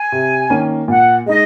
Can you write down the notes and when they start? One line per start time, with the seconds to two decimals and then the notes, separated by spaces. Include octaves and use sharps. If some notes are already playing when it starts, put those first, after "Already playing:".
Already playing: G#5
0.12 C3
0.50 D#3 A#3 C#4
0.88 A#2 F#5
1.26 G#3 D#4 D#5